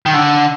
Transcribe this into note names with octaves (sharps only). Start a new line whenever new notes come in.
D#3
D3